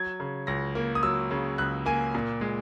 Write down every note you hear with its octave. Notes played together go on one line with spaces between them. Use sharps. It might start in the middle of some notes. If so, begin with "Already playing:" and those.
Already playing: F#3 G#6
C#3
C#2 A#6
A#3
D#6
F#3 E6
C#3
C#2 F#6
A#3 G#5
A#2
G#3